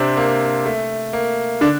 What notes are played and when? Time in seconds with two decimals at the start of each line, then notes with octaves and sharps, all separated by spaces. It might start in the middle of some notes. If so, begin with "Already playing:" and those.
Already playing: C3 C4 D4
0.17 A#3
0.66 A3
1.13 A#3
1.61 D3 D4